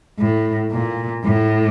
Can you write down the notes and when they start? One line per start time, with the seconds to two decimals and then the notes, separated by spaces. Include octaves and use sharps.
0.19 A2
0.72 A#2
1.24 A2